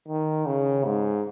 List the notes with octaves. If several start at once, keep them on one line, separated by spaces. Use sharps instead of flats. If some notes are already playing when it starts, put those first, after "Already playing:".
D#3
C#3
G#2